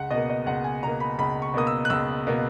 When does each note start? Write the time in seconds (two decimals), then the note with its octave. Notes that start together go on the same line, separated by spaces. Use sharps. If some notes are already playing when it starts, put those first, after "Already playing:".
Already playing: C#2 F#5
0.11 B2 D#5
0.16 A#3
0.29 D#5
0.46 C#2 F#5
0.64 G#5
0.83 B2 A#3 A#5
1.00 B5
1.19 C#2 B5
1.42 C#6
1.54 B2 A#3 D#6
1.67 E6
1.85 F#6
1.90 C#2 E6
2.27 B2 A#3